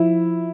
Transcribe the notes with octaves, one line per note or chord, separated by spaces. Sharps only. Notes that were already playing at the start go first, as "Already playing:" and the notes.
Already playing: F3 E4